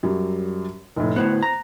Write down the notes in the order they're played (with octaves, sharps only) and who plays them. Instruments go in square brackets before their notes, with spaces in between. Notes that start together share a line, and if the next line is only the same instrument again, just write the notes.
[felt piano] F#2 F#3 G3
F1 A2
[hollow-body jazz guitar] D2 A2 B3 [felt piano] C5 F#6
[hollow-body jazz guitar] A#5